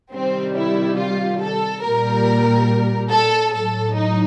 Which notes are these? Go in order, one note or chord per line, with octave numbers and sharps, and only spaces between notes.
C3 D#3 G3 C4
E4
F4
A4
A#2 G3 A#4
A4
A2 F#3 A4
D#4